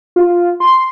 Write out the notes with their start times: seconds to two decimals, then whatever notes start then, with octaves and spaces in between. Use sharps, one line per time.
0.16 F4
0.60 C6